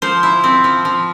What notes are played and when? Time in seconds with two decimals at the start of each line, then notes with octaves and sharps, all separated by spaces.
0.02 F3 C5
0.23 E4
0.44 C4
0.64 F3
0.85 F3